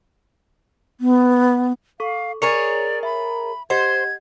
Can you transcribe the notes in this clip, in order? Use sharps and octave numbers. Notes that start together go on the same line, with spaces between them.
B3
A4 F5 C#6
G#4 A#4 C#5 D5 A#5 C#7
E5 B5
G4 C5 D#5 F#5 G#6